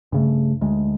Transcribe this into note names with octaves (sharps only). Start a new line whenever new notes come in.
G2 C#3 A3
D2 G#3